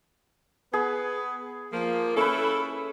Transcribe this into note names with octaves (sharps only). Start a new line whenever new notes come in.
B3 G#4 B4
F3 A#3
C#4 E4 A4 B4